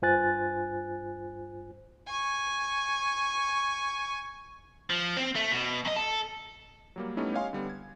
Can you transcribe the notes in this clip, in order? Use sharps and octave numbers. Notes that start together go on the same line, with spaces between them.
G2 F4 C5 G#5 F#6 A6
G#5 C#6
F3
C4
A3
B2
F#2 D#5
A4
F#3 G3 A#3
G3 A3 B3 C#4 D#4 E4
G4 C#5 D#5 F5 G#5 C6
D3 G3 B3
G#6